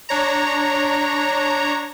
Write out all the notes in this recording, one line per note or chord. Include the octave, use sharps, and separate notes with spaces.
D4 C#5 A#5